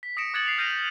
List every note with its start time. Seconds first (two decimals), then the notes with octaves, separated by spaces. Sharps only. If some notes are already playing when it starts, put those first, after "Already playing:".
0.03 B6
0.17 D#6 A#6 C#7 D7 E7
0.34 D6 F#6 G#6 A6 C#7 F#7
0.46 C7 F7
0.58 F6 G6 A#6 D#7 F7
0.70 F#7